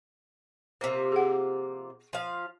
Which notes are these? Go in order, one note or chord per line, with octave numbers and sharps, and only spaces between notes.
C3 F3 A#3 C5
G#4 F#5
F3 F5